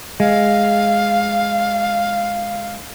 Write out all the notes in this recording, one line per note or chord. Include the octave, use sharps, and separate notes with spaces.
G#3 F5